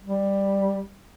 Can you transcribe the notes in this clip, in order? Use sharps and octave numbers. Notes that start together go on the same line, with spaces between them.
G3